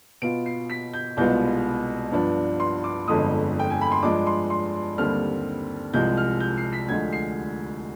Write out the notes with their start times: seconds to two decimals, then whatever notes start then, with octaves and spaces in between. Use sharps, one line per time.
0.22 B2 B3 F4 D7
0.46 C7
0.70 B6
0.93 G6
1.17 C2 B2 G#3 B3 F4 G6
2.12 G2 F3 B3 D4
2.60 C6
2.84 D6
3.08 G1 F2 D3 G#3 D#6
3.59 G5
3.70 G#5
3.81 B5
3.92 C6
4.02 G2 F3 G#3 D4 D6
4.27 C6
4.50 C6
4.98 D#2 D3 G3 C4 F6
5.93 C2 C3 F3 G#3 G6
6.17 F6
6.40 G6
6.57 C7
6.73 B6
6.88 D2 D3 F3 G#3 G#6
7.13 C7